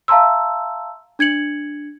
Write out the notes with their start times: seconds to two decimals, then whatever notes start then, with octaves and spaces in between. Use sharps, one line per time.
0.08 E5 F5 A5 A#5 C6 E6
1.19 D4 G#6 C#7 F#7